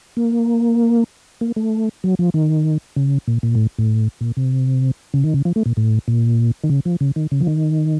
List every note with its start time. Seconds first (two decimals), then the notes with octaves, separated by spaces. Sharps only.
0.17 A#3
1.41 A#3
1.56 A3
2.04 F#3
2.19 F3
2.34 D#3
2.96 C#3
3.27 A#2
3.43 A#2
3.55 A2
3.79 A2
4.21 A#2
4.37 C3
5.14 C#3
5.24 D#3
5.34 C#3
5.45 F3
5.56 A3
5.66 A#2
5.77 A2
6.08 A#2
6.63 D#3
6.69 C#3
6.85 F3
7.00 C#3
7.16 D#3
7.31 C#3
7.40 F3
7.47 D#3